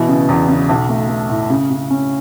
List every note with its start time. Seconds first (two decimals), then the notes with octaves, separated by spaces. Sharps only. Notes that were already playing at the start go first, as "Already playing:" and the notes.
Already playing: B2 E3
0.08 C#3
0.29 E2
0.48 C#3
0.69 B1
0.89 A3
1.09 A3
1.30 A2
1.50 C#3
1.70 C#3
1.90 C#4